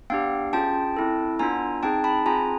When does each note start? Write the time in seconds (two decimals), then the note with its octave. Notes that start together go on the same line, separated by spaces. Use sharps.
0.10 B3 D4 G4 F5 G5
0.53 C#4 F4 G#4 G5 A5
0.97 C4 E4 A4
1.39 B3 D4 F4 G#5 A#5
1.83 C4 D#4 G#4 G5 A5
2.04 A5 B5
2.26 C4 F4 G#4 G#5 A#5